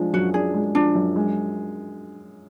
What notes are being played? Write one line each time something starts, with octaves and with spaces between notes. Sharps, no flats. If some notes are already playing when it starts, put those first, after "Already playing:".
Already playing: F3 G#3 D4
F#2 F#4
D4 G#4
G#3
F3 D4
F#2
G#3